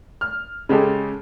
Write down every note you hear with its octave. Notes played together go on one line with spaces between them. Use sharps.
F6
C#3 G#3 G4 A4